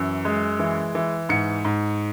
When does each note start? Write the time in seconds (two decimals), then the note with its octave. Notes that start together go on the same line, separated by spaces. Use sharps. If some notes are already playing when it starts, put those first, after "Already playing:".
Already playing: F#2 E3
0.25 G#3
0.59 E3
0.95 E3
1.29 G#2 C#7
1.65 G#2